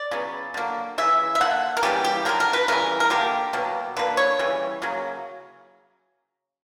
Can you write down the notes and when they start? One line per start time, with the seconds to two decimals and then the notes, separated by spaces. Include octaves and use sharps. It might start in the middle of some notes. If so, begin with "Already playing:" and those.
Already playing: D5
0.11 C#3 F#3 B3
0.54 D3 F#3 A#3
0.98 C#3 E3 E5
1.35 E5
1.40 D3 A#3 F#5
1.77 A#4
1.83 C#3 E3 G3 A#3 G4
2.05 G4
2.25 D3 F#3 A#3 A#4
2.40 A#4
2.53 B4
2.68 C#3 E3 G3 A#4
3.00 A#4
3.10 D3 A#3 G4
3.53 B2 F#3 A#3
3.97 D3 A#3 B4
4.17 C#5
4.39 C#3 E3 G3
4.82 C#3 F#3 A#3